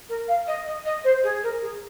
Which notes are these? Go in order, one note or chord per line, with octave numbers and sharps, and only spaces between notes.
A#4
F5
D#5
D#5
D#5
C5
G#4
A#4
G#4